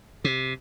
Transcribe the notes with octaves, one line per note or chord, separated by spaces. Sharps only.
C3